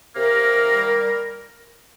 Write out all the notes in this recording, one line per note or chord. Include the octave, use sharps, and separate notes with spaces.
C3 A#3 A#4
C3
D#3
G3
G3